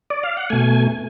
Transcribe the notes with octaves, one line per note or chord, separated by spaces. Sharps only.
D5
F5
F#5
B2 A3 G#5